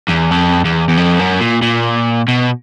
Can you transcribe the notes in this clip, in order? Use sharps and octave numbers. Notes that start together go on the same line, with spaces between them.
E2
F2
E2
E2
F2
F#2
A#2
A#2
B2